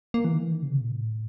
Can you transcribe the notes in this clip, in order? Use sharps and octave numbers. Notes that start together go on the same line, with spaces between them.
A#3
E3
D#3
E3
D#3
C#3
C3
A#2
A2